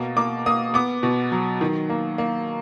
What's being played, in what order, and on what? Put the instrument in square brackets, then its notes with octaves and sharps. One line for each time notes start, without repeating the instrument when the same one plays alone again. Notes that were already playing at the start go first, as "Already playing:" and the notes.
Already playing: [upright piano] B2 A#3
A#3 D6
A#3 D#6
B3 D6
B2
F#3
D#3
A#3
A#3